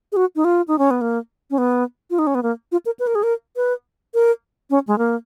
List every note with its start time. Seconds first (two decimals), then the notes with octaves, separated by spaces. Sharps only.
0.12 G#4
0.16 F#4
0.36 D#4
0.44 F4
0.68 D#4
0.79 C#4
0.91 B3
1.01 A#3
1.51 C#4
1.58 B3
2.10 F4
2.19 D#4
2.27 C#4
2.35 B3
2.43 A#3
2.72 F4
2.86 A#4
2.99 B4
3.07 A#4
3.15 G#4
3.23 A#4
3.56 B4
4.14 A#4
4.70 C#4
4.88 G#3
4.98 A#3